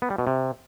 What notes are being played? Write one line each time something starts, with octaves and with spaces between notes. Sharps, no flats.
B3
G3
B2
C3